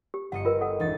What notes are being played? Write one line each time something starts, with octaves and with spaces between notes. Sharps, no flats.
G4
G1 D#5 F#5 C#7
F4 A#4 B4
A4 F#5
E1 D#4 A6